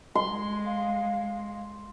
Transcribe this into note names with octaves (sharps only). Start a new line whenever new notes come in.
G#3 C6
F5